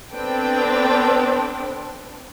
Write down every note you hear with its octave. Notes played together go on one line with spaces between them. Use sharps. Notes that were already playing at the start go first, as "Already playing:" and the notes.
B3 C4 D4 A4 B4 G5